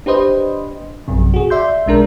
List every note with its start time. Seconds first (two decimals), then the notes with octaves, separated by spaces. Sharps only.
0.06 D4 G4 B4 C5 D#5
1.08 A#1 F#2 C3
1.34 F#4 G#4
1.50 D5 E5 C6 G6
1.86 B1 G#3 D4 A#4